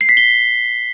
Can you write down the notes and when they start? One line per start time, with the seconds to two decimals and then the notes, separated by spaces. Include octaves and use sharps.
0.01 C7
0.09 B6
0.17 G7